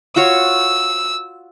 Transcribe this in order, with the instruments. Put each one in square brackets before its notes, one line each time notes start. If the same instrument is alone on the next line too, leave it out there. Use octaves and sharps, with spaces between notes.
[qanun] F4 F#4 C#5 [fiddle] E6